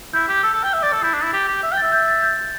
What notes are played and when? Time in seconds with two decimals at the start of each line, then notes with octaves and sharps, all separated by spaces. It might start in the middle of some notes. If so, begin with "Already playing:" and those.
0.13 E4 G6
0.28 G4 G6
0.43 A4 E6
0.53 A4
0.63 G5
0.73 E5
0.83 D5 A6
0.93 A4 A6
1.03 E4 G6
1.13 D4
1.22 E4
1.33 G4
1.48 G4
1.63 E5
1.72 G5
1.77 A6
1.83 E5
1.92 G6
2.08 A6
2.22 G6